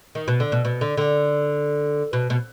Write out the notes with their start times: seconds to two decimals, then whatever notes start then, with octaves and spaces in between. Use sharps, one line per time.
0.15 D#3
0.28 B2
0.40 D3
0.52 B2
0.65 B2
0.81 D3
0.97 D3
2.13 B2
2.30 B2